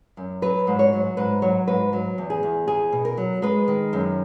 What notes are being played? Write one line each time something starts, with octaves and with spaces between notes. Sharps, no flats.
F#2
F#3 B4
G#2
C#5
F#3
G#2 B4
F#3 C#5
G#2 B4
F#3
E2
G#4
E2
E2 G#4
B2
A#4
F#3
G#3 B4
D#3
F#2